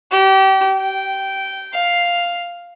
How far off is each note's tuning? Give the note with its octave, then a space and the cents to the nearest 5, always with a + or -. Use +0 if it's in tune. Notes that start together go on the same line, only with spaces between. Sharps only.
G4 -30
G5 -15
F5 +0